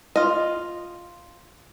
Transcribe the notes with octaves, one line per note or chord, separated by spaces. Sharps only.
F4 D#5